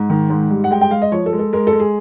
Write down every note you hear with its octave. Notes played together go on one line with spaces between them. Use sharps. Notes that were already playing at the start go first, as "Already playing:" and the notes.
Already playing: G#2
D#3
G#2
G3
F#5
G#3 G5
G5
G#3 F5
D#5
F3 C#5
A4
G#3
A4
G#3 A#4
A4
G#3
G#4